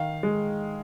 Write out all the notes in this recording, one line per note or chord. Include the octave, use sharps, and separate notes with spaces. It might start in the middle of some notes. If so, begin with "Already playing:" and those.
Already playing: D#3 F5
G#3